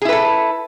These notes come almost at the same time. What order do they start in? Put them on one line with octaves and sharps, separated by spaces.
G#4 E4 B4 A4